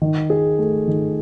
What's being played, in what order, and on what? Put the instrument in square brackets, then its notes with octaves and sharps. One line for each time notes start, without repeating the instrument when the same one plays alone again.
[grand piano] D#3
G#4
A3
D#3